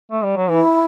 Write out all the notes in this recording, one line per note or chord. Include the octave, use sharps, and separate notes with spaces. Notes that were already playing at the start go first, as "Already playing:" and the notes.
A3
G3
F#3
E3 E4